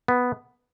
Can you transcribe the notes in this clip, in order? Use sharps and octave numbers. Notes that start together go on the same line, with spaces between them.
B3